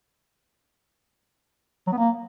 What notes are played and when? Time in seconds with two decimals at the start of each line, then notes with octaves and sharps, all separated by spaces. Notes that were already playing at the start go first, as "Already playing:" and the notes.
1.87 F#3
1.92 B3
1.97 A#3